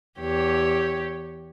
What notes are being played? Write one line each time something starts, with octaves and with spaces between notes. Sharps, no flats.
E2 G4 C#5